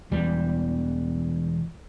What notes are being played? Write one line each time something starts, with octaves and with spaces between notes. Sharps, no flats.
E1 E2 G3